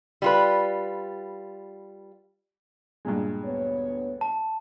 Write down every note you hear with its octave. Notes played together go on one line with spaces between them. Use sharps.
G3 F4 B4
G2 A#2 G#3
D2 B3 C#5
A5